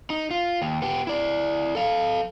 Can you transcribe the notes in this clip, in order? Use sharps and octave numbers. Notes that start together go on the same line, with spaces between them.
D#4
F4
D#2
B3 G4
E4 D5
A4 F5